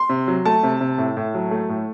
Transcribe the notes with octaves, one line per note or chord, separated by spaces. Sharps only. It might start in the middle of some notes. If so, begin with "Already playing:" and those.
Already playing: C6
C3
F#3
A3 A5
C3
C3
A2
A2
F#3
A3
A2